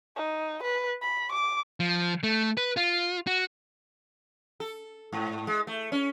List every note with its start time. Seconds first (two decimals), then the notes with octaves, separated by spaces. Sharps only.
0.16 D#4
0.63 B4
1.02 B5
1.32 D6
1.80 F3
2.23 A3
2.57 B4
2.77 F4
3.27 F#4
4.60 A4
5.12 G#2
5.47 G#3
5.67 A3
5.92 C#4